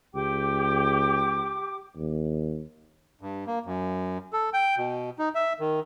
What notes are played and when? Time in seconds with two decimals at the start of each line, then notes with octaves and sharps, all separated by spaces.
0.14 C#2 G4 G5 D6
1.96 D#2
3.21 G2
3.47 A#3
3.66 F#2
4.33 A4
4.54 G5
4.78 B2
5.19 D#4
5.35 E5
5.60 D#3